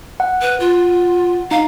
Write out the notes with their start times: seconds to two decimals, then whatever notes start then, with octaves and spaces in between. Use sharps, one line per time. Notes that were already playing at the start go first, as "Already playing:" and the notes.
0.20 F#5
0.41 B4
0.60 F4
1.51 D#4 F5